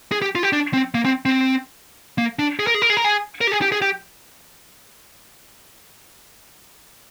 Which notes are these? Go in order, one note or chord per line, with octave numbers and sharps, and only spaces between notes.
G#4
G4
F4
G4
D4
C4
A#3
C4
C4
A#3
D4
G#4
A#4
G#4
A#4
G#4
A#4
G#4
A#4
G4
G#4
G4
G#4
G4